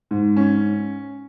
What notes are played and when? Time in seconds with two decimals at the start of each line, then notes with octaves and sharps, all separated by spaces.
0.11 G#2
0.36 C#4